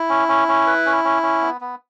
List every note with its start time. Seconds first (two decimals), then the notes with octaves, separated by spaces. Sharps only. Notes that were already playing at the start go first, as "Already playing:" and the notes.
Already playing: E4
0.10 C#4
0.28 C#4
0.48 C#4
0.67 B4
0.86 C#4
1.04 C#4
1.22 C#4
1.42 B3
1.61 B3